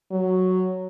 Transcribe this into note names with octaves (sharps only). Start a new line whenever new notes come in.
F#3